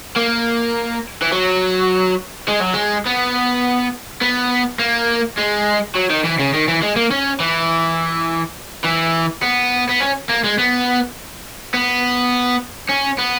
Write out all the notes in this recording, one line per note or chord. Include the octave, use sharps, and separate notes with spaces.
A#3
E3
F#3
G#3
F#3
G#3
B3
B3
A#3
G#3
F#3
D#3
E3
C#3
D#3
E3
G#3
A#3
C#4
E3
E3
B3
B3
C#4
A#3
G#3
B3
B3
C#4
B3